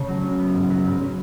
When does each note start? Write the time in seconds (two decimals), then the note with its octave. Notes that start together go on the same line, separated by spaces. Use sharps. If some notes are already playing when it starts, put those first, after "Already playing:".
Already playing: C#3 A3 C#5
0.08 F#3
0.23 C#4
0.39 B3
0.54 G#2
0.70 F#3 B4
0.86 G#2
1.01 C#4